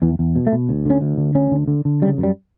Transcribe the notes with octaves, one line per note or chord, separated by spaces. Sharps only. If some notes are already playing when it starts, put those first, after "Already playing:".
E2 E3
E2
B2
A3
B2
D2
D3 C#4
D2
D3
D2 C#4
D3
D3
D3
C#3 G3
F#2
G3